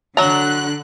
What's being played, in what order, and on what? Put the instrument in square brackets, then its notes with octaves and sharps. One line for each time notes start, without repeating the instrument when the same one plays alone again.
[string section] D3 F#6 [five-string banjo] F#3 A#5